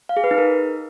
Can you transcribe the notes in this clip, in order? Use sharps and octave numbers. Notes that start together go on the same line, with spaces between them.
F5
G#4
B4
D#4
A#4